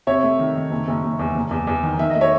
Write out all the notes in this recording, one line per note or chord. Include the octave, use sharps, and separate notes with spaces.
C3 C#5 E5
A3
D#3
D#3
F#1
F#1
F#1
E2
F#1
E2
E2
D#3
D#3 E5
D#5
A3
C#5 E5